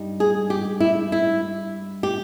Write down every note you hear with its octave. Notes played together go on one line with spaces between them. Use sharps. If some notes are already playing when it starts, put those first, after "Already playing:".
Already playing: G2 G3 D#4
G#4
G4
E4
E4
G4